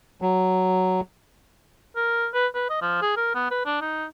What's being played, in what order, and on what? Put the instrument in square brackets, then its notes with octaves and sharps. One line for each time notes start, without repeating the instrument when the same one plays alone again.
[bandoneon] F#3
[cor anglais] A#4
B4
B4
D#5
F3
G#4
A#4
B3
B4
D4
D#4